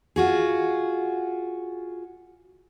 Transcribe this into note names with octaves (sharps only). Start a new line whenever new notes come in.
F4 F#4 G#4